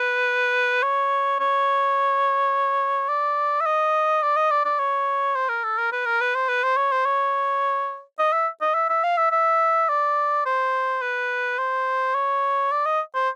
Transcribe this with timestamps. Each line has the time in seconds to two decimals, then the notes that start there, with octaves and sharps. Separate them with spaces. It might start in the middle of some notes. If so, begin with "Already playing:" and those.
Already playing: B4
0.83 C#5
1.40 C#5
3.09 D5
3.61 E5
3.66 D#5
4.22 D5
4.36 D#5
4.51 D5
4.65 D5
4.79 C#5
5.36 C5
5.49 A#4
5.64 A4
5.78 A#4
5.92 B4
6.06 A#4
6.21 B4
6.35 C5
6.49 B4
6.63 C5
6.77 C#5
6.92 C5
7.06 C#5
8.19 D#5
8.33 E5
8.61 D#5
8.75 E5
8.89 E5
9.04 F5
9.17 E5
9.32 E5
9.89 D5
10.46 C5
11.02 B4
11.58 C5
12.15 C#5
12.72 D5
12.86 D#5
13.15 C5